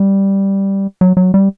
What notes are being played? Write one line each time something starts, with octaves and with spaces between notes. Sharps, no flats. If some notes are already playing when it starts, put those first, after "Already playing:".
Already playing: G3
F#3
F#3
G3